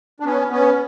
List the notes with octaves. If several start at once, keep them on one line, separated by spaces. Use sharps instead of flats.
D4
B3 C#4
B3 C#4